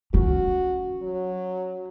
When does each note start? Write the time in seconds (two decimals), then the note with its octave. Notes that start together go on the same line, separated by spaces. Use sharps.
0.14 C#4 F#4
1.02 F#3